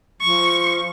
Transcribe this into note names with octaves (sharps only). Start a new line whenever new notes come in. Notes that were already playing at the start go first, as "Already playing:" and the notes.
F3 C#6